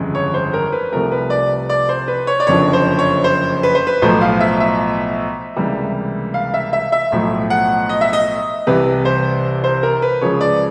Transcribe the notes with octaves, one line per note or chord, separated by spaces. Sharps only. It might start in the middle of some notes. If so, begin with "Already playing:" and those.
Already playing: G1 F2 C#3 E3 G#3
C#5
C5
A#4
B4
C2 C3 F3 A3 A#4
B4
D5
D5
C5
B4
C#5
D5
F#1 F2 D3 F3 C#5
C5
C#5
C5
B4
C5
B4
B1 A2 F3 A3 C5
F5
E5
E5
C#2 C3 E3 G3 A#3
F5
E5
E5
E5
B1 A2 F3 A3
F#5
D#5
E5
D#5
C2 C3 E3 B4
C5
C5
A#4
B4
C#2 C#3 F3 C#5
D5